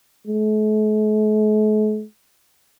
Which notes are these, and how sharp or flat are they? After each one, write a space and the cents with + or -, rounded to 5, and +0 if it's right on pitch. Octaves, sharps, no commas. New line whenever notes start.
A3 -45